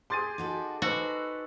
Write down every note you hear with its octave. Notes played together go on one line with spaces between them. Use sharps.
G4 G#4 C6 A6 D#7
D#4 F#4 A4
D#4 F#4 A4 B4 C5 D#6